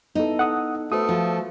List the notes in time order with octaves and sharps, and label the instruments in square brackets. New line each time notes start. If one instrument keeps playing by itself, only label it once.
[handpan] B3 E4 A4 [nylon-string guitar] D#4
[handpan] A4 [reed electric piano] F#5 D#6
[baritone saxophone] A3 [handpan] F#4 B4 C5 [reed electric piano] D#6
[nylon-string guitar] F3 [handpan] F4 F#4